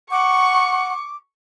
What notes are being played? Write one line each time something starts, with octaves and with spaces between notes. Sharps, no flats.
F#5 C#6 D6